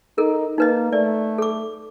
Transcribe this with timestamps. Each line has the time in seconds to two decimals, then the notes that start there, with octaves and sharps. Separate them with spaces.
0.18 D#4 A4 A#4
0.58 A#3 D#4 B4 D#5
0.93 A3 D5
1.38 A4 D6